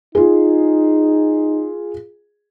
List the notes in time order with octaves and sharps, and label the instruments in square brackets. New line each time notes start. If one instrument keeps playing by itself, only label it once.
[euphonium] D#4 [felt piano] F4 G#4